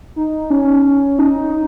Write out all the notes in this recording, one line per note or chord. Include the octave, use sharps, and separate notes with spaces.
D#4
C#4
D#4